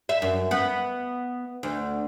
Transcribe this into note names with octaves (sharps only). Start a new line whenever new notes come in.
E5
F#2
B3
D2